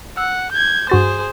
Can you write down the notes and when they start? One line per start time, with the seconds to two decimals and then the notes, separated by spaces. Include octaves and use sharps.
0.17 F#5 E6
0.52 G6 G#6
0.90 G2 F#4 G#4 C5 A6